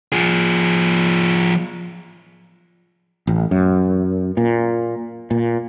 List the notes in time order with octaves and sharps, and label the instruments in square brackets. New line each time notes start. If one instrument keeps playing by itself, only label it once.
[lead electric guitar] F3 G#4
[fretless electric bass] A1
F#2
A#2
A#2